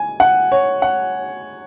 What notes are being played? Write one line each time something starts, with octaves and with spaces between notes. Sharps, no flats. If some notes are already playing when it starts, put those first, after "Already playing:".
Already playing: G#5
F#5
C#5
F#5